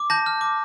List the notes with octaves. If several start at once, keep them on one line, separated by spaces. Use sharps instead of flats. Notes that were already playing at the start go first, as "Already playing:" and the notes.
Already playing: D6
A5 G6 A#6
F6
D6